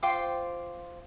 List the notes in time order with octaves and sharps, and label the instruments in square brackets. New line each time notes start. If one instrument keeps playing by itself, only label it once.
[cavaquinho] F4 C5 G5 D6